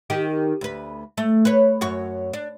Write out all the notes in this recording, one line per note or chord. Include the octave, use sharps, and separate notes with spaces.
D#3 D#4 G4
D2 B4
A3
B4 C#5
F#2 F#4 C#5
D4